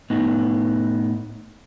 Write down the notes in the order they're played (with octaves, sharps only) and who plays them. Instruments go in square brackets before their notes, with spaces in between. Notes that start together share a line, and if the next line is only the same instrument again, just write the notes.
[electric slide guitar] A2 B3 D#4